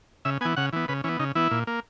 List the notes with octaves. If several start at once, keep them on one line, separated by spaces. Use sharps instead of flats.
C#3 E5
E3 B3 G#5
C#3 F#5
E3 B3
C#3 B4
E3 B3 C#4
C#3 D#4
E3 B3 E4
A#2
A#3